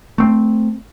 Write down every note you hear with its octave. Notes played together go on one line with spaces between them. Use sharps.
A3 C4